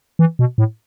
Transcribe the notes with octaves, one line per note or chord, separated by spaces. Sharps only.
E3
B2
A2